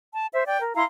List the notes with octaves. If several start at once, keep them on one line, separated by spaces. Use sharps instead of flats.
A5
C5 E5
D5 G5
A#4
E4 F5 A#5 C6